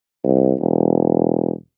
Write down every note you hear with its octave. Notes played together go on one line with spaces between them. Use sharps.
C2
E1